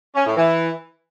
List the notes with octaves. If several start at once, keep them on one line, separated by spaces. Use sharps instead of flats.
C#4
A2
E3